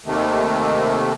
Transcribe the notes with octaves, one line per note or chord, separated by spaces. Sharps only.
D#2 C3 D#3 A3